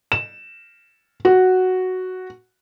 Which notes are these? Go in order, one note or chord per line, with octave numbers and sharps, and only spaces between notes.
E7
F#4